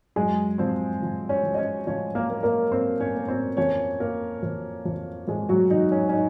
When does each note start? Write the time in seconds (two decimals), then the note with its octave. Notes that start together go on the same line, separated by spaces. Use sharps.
0.16 F#2 G#3 G#4
0.58 F3 C4 C5
1.02 F3
1.29 C#4 C#5
1.43 F3
1.54 D#5
1.58 C#4 C#5
1.87 F3 C#4 C#5
2.15 A#3 A#4
2.30 A#3
2.43 A#3 A#4
2.72 A#3 C4 C5
3.00 C#4 C#5
3.15 A#3
3.28 C4 C5
3.57 F2 C#4 C#5
4.00 A#3 A#4
4.43 F2
4.86 F2
5.28 F2 G#3 G#4
5.49 F#3 F#4
5.71 F2 D#4
5.92 C#4
6.09 C#4
6.14 D#4